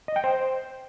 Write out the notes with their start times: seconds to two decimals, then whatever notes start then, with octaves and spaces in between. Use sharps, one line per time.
0.08 D#5
0.16 G5
0.24 C5